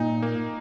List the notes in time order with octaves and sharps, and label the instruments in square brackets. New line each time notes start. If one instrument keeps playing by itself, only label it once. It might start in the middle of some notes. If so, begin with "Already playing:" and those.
Already playing: [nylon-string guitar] A#2 [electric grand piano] D#4
[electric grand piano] A#3